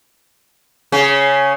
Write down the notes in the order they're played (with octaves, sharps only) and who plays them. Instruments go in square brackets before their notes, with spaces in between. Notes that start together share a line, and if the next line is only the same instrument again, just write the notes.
[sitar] C#3 C#4